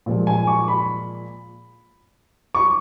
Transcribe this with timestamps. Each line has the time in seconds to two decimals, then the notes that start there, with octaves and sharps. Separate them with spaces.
0.06 A#2 F3 G#3
0.27 G#5
0.47 C#6
0.68 B5
2.55 C#6